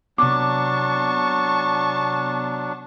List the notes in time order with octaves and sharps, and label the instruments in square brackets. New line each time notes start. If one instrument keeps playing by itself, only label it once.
[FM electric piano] C3 B3 [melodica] F#3 D4 [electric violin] A5 C#6 [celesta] D6